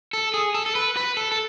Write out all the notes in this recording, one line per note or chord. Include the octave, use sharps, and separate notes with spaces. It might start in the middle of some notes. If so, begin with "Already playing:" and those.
A4
G#4
A4
A4
B4
B4
A4
A4